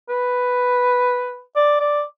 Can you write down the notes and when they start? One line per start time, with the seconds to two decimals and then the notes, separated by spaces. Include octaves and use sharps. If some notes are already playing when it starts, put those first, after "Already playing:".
0.09 B4
1.55 D5
1.80 D5